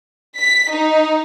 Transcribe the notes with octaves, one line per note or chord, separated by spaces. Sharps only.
B6
D#4